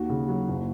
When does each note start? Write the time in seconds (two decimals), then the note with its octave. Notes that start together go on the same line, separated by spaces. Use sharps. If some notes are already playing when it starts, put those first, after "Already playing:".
Already playing: D#2 D#3 F#4
0.10 C#3
0.28 F#3
0.48 F#1